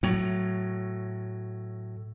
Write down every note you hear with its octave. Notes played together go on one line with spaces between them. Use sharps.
A2 F#3